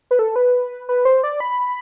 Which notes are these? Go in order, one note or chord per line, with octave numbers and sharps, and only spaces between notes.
B4
A4
B4
B4
C5
D5
B5